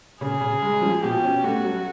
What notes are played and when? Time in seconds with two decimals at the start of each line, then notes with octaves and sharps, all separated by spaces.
0.21 C#3 G#4
0.41 C#3
0.62 G#3
0.82 F3
1.03 B2 G4
1.24 C#4
1.44 A3 F#4
1.64 F#3